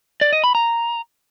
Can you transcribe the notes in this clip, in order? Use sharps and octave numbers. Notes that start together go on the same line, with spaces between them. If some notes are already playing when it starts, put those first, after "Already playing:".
D5
D#5
B5
A#5